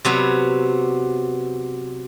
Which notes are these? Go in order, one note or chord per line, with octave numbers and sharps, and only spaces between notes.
C3 F#3 B3